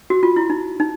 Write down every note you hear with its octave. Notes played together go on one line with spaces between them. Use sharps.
F#4
F4
E4
D#4
D#4